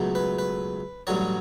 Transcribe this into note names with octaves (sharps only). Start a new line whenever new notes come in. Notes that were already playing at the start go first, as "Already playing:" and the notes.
Already playing: C#2 B2 F#3 A3
B4
B4
A1 G2 D3 F#3 C#5